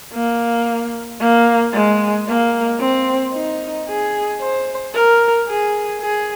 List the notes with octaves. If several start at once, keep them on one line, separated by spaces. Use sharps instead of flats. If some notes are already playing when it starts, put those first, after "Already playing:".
A#3
A#3
G#3
A#3
C4
D#4
G#4
C5
A#4
G#4
G#4